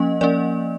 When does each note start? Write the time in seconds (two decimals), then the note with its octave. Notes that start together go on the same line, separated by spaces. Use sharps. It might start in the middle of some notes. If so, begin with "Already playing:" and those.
Already playing: F3 A#3 C#4 D#5
0.21 F3 A#3 C#4 D5